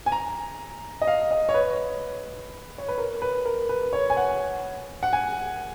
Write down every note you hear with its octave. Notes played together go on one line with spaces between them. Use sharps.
G#5
A#5
D#5
F5
D#5
C#5
B4
C#5
B4
A#4
B4
A#4
B4
C#5
G#5
F#5
F#5
G#5